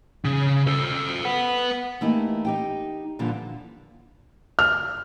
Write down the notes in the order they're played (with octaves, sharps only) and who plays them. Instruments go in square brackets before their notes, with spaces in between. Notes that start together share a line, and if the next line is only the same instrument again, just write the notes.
[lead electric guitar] C#3
A4 C5
B4 F#5
[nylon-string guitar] E3 A3 A#3 D#4 E4 G4
D#4 G4 G5
A#2 D3 E3 F3 G3
[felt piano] F6